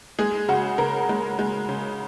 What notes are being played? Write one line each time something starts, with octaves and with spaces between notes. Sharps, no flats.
G#3 G#4
C#3 F#4
C#3 A#4
G#3
G#3
C#3